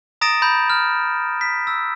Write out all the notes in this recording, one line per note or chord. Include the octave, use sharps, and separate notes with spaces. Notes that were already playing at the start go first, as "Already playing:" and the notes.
A#5 D#6 A6 A#6 D7 E7
A#5 B5 G6
F6
B6
E6